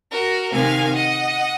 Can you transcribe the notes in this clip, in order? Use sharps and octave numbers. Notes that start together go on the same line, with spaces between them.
F#4 A#4
C3 D#3 F5 G#5
D#5 F#5